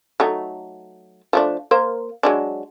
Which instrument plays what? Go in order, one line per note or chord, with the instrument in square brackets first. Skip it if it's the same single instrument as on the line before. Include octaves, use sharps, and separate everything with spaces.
[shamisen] F#3 A3 D#4
F3 A3 D4
A#3 A#4 C5
F#3 G#3 D4